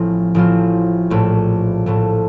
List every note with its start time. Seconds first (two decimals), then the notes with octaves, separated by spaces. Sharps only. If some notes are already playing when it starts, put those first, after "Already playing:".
Already playing: A1 A2 F3 C4 F4
0.35 A1 A2 F3 C4 F4
1.10 A#1 A2 A3
1.86 A#1 A2 A3